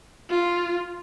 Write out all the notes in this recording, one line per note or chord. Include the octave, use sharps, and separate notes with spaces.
F4